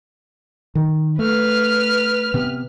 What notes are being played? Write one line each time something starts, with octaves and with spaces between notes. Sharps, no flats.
D#3
A3 B4 F6
C3 B3